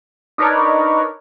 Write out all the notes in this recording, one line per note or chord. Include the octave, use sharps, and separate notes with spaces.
D4 D#4 A#4 B4 C#5 D5